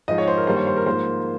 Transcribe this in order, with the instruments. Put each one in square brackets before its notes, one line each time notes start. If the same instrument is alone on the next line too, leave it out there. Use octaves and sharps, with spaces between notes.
[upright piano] G#2 F3 G#3 D#5
C#5
C5
A#4
G2 D#3 G3 A#3 C5
C#5
C5
A#4
G#2 F3 A#3 C5